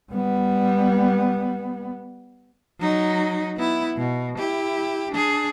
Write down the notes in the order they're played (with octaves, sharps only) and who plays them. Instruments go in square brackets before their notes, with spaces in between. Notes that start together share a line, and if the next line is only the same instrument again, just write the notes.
[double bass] G3 B3
[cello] F#3 D#4
B3 E4
B2
E4 G4
D4 G#4